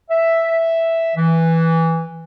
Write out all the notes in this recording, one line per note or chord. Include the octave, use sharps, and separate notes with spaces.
E5
E3